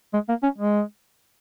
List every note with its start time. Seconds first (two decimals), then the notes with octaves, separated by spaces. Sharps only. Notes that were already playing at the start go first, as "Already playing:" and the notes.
0.13 G#3
0.29 A#3
0.43 C#4
0.59 G#3